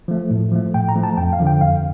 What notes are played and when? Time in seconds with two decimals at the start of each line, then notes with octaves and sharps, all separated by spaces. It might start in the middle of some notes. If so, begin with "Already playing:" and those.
0.08 F3 A3
0.31 A2
0.52 F3 A3
0.74 A2 G5
0.89 A#5
0.96 F3 A3
1.03 A5
1.17 F2 G5
1.33 F5
1.40 D3 F3
1.47 G5
1.61 F2 F5